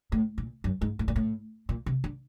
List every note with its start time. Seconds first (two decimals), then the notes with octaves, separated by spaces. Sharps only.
0.12 A2
0.38 A#2
0.64 F#2
0.82 G#2
0.99 A2
1.08 A#2
1.16 A2
1.69 A#2
1.86 C3
2.04 D3